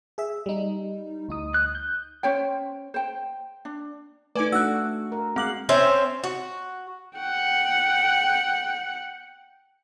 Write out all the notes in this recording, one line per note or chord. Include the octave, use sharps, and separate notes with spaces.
G#4 E5
G3 D#4
D2 D#4 D#6
F#6
G6
C#4 C5 C#5 G5
C5 G5
D4
A3 D#4 B4 D5 G#5 D6
A3 D4 F#4 E6 F#6
A#4
G#3 C4 F5 F#5 D6 F#7
C4 C#4 C5 E5
F#4
F#5 G5